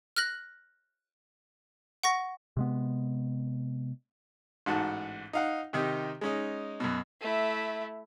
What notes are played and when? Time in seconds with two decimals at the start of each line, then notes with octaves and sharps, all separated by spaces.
0.17 F6 F#6 A#6 F#7
2.04 F#5 C#6 A#6
2.57 C3 G#3 B3
4.66 A1 G#2 F#4 A5
5.33 D#4 F5 F#5
5.73 C3 D#3 D#4 G4
6.21 G#3 C#4 D#4
6.80 F#2 B2
7.21 A3 E4